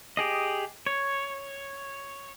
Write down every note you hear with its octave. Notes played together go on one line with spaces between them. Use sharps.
G4 G#4 D#5
C#5